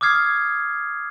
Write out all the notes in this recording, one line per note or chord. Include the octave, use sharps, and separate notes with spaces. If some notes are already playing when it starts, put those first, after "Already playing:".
D6 D#6 F6 G#6 C7